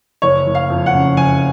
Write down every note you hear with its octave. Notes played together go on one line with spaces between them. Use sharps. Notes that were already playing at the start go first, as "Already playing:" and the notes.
F#1 C#5
F#1
F5
F2
F#5
C#3
F#1 G#5